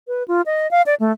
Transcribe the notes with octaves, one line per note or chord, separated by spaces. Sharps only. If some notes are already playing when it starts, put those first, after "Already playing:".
B4
F4
D#5
F5
D5
A3